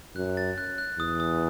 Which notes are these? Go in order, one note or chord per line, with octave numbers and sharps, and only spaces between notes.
F#2 F#6
A6
F#6
F#6
E2 D#6
D#6